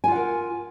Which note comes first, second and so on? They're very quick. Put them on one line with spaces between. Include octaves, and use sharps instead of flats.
G#5 F4 F#5 A#4